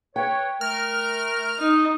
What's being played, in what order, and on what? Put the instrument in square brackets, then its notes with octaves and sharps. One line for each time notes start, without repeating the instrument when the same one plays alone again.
[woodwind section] B4 C#5 [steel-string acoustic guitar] G5
[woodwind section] A3 A#4 [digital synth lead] F6
[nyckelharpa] D#4